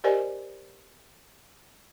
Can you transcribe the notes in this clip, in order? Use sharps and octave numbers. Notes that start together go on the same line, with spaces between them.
G4 A#4 C5 D5 D#5 G#5